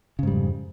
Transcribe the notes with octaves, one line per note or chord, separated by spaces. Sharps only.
F2 G#2 C#3 G3